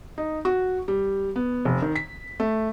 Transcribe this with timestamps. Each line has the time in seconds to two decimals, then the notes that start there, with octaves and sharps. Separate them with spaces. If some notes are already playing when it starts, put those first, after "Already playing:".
0.18 D#4
0.45 F#4
0.88 G3
1.36 B3
1.65 F1
1.82 D#3
1.96 B6
2.40 A3